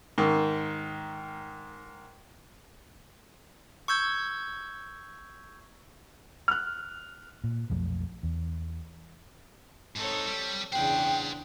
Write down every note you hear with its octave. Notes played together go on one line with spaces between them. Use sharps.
G#2 D#3
C#6 E6 G6 G#6
F6 F#6
A#2
B1 F2 F3 A3
E2
G#2 C4 D#4 A4 C#5
G3
E2 C#3 D4 C5 F#5 G5